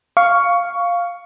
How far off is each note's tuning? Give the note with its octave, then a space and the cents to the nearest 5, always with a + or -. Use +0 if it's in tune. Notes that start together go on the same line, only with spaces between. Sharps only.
F5 +0 C#6 +15